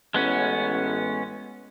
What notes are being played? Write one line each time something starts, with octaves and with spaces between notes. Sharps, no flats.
A1 G#3 B3 C#4